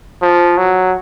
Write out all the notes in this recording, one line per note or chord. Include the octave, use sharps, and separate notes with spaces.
F3
F#3